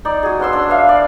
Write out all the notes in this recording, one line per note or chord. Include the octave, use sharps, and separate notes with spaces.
D#4 D5
F#4 G#4
C#4 B4 C6 E6
D4
B4 E5 F5
D5